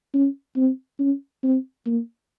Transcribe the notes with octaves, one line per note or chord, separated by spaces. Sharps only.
C#4
C4
C#4
C4
A#3